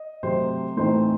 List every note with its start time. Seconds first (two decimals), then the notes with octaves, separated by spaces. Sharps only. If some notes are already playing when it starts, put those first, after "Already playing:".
Already playing: D#5
0.23 C3 F#3 A3 C5
0.77 A2 E3 A3 C4 D#4 C5